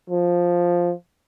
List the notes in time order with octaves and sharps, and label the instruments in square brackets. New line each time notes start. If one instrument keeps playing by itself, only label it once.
[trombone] F3